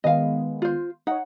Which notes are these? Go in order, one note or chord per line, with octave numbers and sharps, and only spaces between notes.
D#3 G#3 B3 D#5 F5
F4 C5
D#4 C#5 F#5